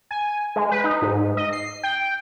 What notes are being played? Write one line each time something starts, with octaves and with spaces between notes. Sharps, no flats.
G#5
G#3
B4
D#4
G#2
D#5
C7
G5